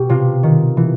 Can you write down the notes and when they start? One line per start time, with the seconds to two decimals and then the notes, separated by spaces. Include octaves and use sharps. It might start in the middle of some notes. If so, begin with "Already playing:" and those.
Already playing: B2 G4
0.09 C3 F4
0.43 D#3
0.77 E3